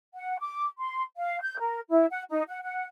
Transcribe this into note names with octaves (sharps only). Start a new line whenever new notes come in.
F#5
D6
C6
F5
G6
A#4
E4
F#5
D#4
F#5
F#5